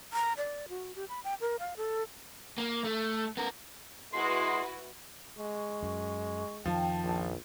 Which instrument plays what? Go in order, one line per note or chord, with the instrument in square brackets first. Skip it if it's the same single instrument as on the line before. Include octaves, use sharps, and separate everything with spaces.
[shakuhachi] A#5
D5
F#4
G4
B5
G5
A#4
F5
A4
[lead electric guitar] A#3
A3
B3 A#4
[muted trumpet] G#3 [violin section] E4 F#4 B4 [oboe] C6
[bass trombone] G#3 [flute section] C#6
[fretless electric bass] F#2
[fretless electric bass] F2 D#3 [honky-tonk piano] F3 [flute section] G5 A5
[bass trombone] A#1